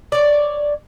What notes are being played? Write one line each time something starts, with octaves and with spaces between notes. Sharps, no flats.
C#5 D5